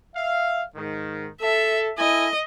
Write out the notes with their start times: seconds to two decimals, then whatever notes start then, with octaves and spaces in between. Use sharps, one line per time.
0.16 E5 F5
0.76 G#2 D#3
1.42 A4 E5
1.99 E4 A4 D#5 G#5